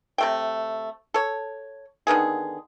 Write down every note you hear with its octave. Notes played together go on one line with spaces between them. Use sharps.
C3 A3 G5
A4 C#5
D3 D#3 B3 G#4